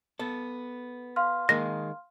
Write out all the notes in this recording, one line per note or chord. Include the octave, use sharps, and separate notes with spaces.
B3 A4
F5 C6 F6
D#3 G#3 A#3 A#6